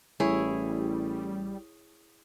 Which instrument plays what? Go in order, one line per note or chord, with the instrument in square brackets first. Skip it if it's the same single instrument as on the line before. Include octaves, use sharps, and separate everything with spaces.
[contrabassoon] A1 [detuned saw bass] G3 [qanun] E4 [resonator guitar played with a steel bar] G#4 C#5